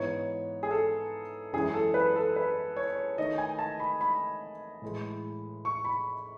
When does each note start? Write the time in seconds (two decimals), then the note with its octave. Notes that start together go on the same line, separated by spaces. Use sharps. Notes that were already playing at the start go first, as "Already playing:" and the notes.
Already playing: G#2 E3 B3 D#4 C#5
0.63 G#4
0.71 A4
1.53 F#2 E3 G#3 C#4 E4 G#4
1.74 A4
1.94 B4
2.16 A4
2.36 B4
2.76 C#5
3.18 D#3 A3 D#4 D#5
3.38 G#5
3.59 A5
3.80 B5
4.01 B5
4.82 A2 E3 G#3
5.65 C#6
5.85 B5